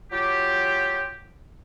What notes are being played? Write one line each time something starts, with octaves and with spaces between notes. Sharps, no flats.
F#3 F4 G4